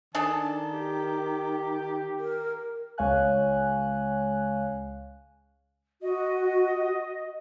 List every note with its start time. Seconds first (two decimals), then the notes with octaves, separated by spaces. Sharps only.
0.15 D#3 D4 G#4 A4 A5
0.73 G4
2.19 A#4
2.98 C#2 G#3 C#5 F5 G#5 F#6
6.02 F#4 D#5